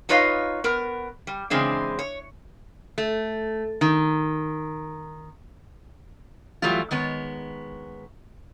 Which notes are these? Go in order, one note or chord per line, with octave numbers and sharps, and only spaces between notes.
D#4 F4 B4 C#5 D#5 F5
B3 A#4
G3
C#3 E3 G#3 C4 D4
C#5
A3
D#3
E3 F#3 G3 A3 F4
D#3 G#3 B3 C#5